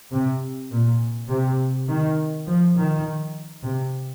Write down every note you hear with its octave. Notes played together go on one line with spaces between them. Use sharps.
C3
A#2
C3
D#3
F3
D#3
C3